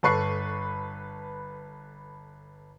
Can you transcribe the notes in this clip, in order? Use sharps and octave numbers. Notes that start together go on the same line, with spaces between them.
G1 A4 B4 C#6 F#6 C7